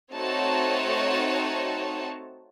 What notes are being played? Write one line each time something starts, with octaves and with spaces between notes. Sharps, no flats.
A3 C4 D#4 F#4 C#5 A5